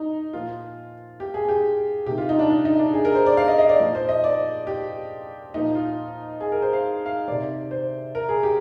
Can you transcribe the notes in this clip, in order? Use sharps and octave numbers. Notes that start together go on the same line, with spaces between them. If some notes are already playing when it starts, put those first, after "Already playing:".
Already playing: D#4
A#2 F3 F4
G4
G#4
G#4
G4
C3 D#3 G4
F4
D#4
D4
D4
D#4
D4
G#4
A#4
C5
D5
F5
D#5
D#5
D5
A#2 F3
C5
D#5
D5
G4
A#2 F3 D#4
F4
G#4
A#4
C5
F5
F5
C3 D#3 D5
C5
A#4
G#4
G4